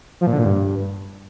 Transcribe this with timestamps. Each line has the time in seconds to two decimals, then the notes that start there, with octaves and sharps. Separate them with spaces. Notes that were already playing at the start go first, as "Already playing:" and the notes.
0.21 F3
0.27 A#2
0.33 D3
0.39 A#2
0.45 G2